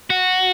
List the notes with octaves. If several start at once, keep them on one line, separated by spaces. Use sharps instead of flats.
F#4